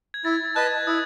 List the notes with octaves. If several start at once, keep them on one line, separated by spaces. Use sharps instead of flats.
G#6
E4 A6
A6
B4 D#5 A5 F#6
G#6
E4 D#6